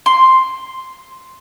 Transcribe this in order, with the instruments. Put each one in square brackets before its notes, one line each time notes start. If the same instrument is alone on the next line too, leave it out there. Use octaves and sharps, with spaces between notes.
[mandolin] C6